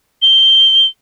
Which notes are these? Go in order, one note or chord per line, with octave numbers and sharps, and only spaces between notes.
G7